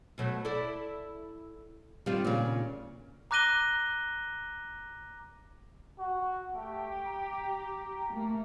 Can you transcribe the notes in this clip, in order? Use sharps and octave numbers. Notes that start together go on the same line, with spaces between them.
B2 F#3 A3
E4 A4 D5
D#3 G3 C4 D4 F4
A#2 C#3
A#5 D6 F#6 A#6 D#7 G7
F#4
A3 G4
A#5
A3 A#3